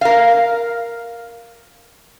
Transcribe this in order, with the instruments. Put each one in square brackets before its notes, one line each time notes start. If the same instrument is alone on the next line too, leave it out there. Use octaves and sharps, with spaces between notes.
[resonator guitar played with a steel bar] A#4 F5